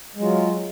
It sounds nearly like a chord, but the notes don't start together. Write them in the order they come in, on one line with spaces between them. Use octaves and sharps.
G#3 F#3 F4